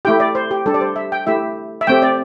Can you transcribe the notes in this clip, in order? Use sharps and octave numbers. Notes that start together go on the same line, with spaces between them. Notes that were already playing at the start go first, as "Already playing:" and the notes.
A3 E4 G4 G5
D5
C5
G4
G3 D4 G4 A4
D5
C5
E5
G5
A3 E4 G4 E5
E5
A3 C4 G4 G5
D5